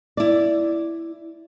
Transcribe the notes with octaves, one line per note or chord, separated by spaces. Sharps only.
E4 D5